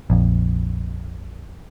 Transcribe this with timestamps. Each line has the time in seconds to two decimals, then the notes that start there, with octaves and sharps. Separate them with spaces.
0.10 A#1 F2